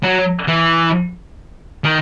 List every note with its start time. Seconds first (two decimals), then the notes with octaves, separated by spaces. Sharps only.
0.03 F#3
0.48 E3
1.84 D#3